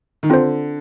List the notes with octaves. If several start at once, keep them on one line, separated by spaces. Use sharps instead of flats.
D#3
D3 C4 F4 C5